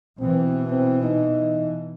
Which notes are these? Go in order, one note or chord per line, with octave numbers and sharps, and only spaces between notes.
B2 E3 C4
C4
D#4